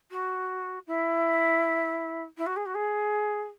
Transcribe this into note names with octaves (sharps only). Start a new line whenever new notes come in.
F#4
E4
E4
F#4
G#4
F#4
G#4